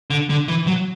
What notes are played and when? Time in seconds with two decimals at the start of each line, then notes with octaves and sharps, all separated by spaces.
0.10 D3
0.30 D3
0.48 E3
0.67 F#3